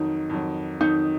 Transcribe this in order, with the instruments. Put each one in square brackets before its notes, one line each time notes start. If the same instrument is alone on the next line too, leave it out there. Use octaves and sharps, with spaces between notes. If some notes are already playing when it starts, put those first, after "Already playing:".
Already playing: [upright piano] F2 D#3 F#3 [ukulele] D#4
[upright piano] F2 D#3 F#3
[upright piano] F2 D#3 F#3 [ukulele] D#4